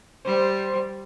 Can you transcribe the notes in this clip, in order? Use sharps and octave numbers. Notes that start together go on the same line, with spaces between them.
G3 C5